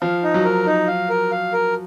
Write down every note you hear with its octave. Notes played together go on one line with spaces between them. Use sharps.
F3 F5
D#4
F#3
A#4
D#4
F5
A#4
F5
A#4